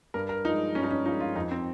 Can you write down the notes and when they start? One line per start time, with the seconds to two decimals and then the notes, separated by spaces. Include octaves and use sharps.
0.14 G2 A#4
0.29 A#4
0.45 F3 D#4
0.50 G#3
0.75 G2 C#4
0.84 D#4
0.91 C#4
1.06 F3 G#3 D#4
1.20 F4
1.35 F2 D#4
1.51 C4